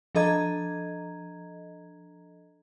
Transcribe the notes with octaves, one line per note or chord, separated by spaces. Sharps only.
F3 D4 A4 D#5 A#5 G#6